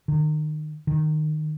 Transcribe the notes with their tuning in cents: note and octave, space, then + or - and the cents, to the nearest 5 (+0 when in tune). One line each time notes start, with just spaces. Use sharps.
D#3 -30
D#3 -20